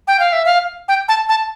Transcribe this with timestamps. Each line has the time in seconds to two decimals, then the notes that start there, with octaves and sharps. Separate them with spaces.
0.08 G5
0.20 F5
0.33 E5
0.45 F5
0.88 G5
1.08 A5
1.29 A5